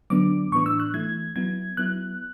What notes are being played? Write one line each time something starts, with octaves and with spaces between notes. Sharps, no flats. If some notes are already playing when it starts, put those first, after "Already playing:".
D3 F#3 B3 D4 D6
A2 E3 B3 D4 C#6
E6
F#6
E3 A3 E4 G#6
F#3 B3 E4 G#6
F#3 B3 E4 F#6